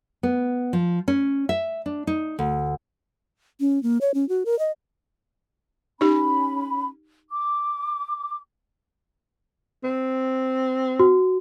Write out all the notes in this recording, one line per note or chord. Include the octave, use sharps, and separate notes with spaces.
B3
F3
C#4
E5
D4
D#4
D2
C#4
A#3
C#5
C#4
F#4
A#4
D#5
C#4 D#4 G4 B5
D6
C4
F#4